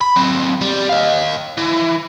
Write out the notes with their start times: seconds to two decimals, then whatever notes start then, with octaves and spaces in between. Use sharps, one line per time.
0.01 B5
0.16 F#3 C4
0.61 G3
0.89 D#5 F5
1.57 E3